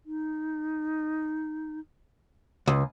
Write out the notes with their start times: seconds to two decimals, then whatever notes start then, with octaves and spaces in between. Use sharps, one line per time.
0.06 D#4
2.67 C#2